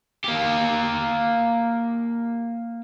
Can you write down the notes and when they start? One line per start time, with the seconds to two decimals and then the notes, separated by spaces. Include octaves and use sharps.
0.24 A#3 G4